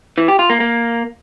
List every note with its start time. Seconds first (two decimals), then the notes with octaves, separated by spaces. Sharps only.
0.18 E3
0.28 G4
0.39 F4
0.50 A#3
0.60 A#3